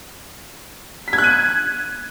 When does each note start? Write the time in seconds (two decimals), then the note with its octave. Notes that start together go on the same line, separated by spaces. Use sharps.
1.08 B6
1.13 G#6
1.18 F#6
1.24 D#7